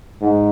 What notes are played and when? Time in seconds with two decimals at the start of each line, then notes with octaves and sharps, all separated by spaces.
0.21 G#2